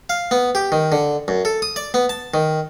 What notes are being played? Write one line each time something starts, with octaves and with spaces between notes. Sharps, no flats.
F5
B3
G4
D#3
D3
F#2
A4
D#6
D5
B3
A5
D#3